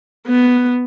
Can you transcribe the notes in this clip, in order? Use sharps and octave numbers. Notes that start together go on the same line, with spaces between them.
B3